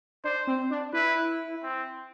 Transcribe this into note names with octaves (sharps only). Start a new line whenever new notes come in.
D4 C5
C4
D4
E4 B4
C4